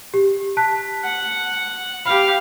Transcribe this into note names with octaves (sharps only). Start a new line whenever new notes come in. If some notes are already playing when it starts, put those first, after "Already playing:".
G4
A5 F#6 B6
F#5
G4 F5 B5